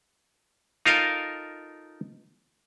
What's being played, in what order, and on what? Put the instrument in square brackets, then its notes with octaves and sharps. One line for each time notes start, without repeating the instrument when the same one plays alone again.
[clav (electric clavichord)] D#4 F4 A4 A#4 D#5 F5